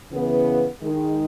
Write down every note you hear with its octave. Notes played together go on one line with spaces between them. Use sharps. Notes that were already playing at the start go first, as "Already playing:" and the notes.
C#3 E3 B3
D#3 G#3 D#4